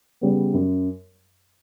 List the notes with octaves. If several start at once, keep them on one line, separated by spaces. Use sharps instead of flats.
C#3 G3 B3
F#2